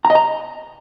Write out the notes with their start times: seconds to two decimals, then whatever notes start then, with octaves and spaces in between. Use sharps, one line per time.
0.05 A#5
0.10 D#5
0.15 A#5